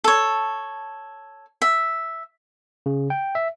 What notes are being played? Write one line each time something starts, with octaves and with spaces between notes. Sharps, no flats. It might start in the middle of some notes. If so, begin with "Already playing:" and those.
A4 C#5
E5
C#3
G5
E5